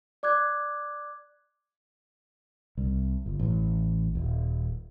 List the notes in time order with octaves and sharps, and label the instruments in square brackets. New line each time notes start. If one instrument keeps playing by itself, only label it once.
[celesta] D5 D6 F#6 G#6
[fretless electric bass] C2
G1
A1
D#1